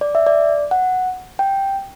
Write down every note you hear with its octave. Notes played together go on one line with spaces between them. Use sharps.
D5
E5
D5
F#5
G5